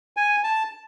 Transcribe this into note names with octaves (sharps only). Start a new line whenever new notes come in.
G#5
A5